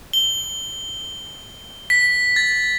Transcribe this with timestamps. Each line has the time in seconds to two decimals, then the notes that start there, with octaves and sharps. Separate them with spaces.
0.13 G7
1.90 B6
2.36 A6